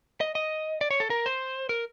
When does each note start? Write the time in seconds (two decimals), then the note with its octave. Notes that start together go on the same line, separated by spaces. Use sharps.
0.21 D#5
0.35 D#5
0.81 D5
0.91 C#5
1.00 A4
1.10 A#4
1.26 C5
1.69 A#4